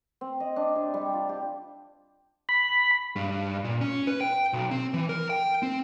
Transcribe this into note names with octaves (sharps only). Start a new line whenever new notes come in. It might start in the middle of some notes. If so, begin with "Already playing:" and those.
C4
D#5
D4
C3
G3
F4
G4
B5
G2
A#2
C#4
B4
G5
B1
C4
E3
A#4
G5
C4